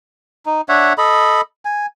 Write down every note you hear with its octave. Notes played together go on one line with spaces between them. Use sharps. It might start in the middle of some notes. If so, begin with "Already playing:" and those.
D#4
D4 C#5 E5 F#5
A4 D#5 B5
G#5